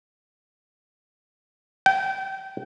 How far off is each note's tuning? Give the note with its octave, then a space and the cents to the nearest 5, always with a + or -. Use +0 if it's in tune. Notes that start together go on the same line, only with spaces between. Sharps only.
G5 -25